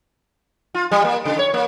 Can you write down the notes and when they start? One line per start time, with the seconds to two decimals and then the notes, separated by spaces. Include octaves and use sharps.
0.74 F4
0.92 G3
1.05 A#3
1.25 C#3
1.39 C#5
1.54 A#3